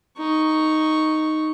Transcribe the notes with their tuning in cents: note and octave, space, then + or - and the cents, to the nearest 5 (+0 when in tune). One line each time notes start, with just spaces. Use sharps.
D#4 +0 C#6 +0